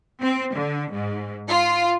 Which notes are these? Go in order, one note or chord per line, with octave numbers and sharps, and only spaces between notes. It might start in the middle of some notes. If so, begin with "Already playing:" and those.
C4
D3
G#2
F4